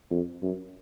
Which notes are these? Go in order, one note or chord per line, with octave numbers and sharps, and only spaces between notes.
F2
F#2